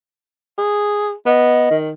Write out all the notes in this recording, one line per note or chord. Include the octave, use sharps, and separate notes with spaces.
G#4
B3 D#5
D#3